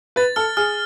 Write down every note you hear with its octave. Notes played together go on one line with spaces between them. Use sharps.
B4 A6
A4 F6
G#4 F6